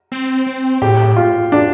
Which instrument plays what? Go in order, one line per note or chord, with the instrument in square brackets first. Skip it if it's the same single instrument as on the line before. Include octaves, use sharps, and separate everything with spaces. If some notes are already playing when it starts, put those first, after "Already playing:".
[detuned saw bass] C4
C4
[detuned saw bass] A2 [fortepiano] G4
[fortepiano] F4
D4